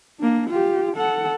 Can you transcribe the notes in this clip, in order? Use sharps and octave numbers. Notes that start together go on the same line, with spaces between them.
A#3 D4
F4 G4
A4 F#5